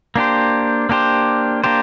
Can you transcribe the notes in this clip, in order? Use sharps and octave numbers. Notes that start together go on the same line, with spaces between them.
A#3 D4 G4 C5
A#3 D4 G4 C5
A#3 D4 G4 C5